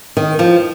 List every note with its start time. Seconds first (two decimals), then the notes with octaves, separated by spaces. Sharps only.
0.17 D#3
0.39 F3